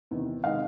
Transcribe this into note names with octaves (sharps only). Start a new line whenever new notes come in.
E2 C3 D#3
C3 D#3 G#3 D#5 F5